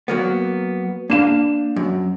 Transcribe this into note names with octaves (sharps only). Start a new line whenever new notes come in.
F#3 A#3 B3
A#3 D4 F5 E7
F#2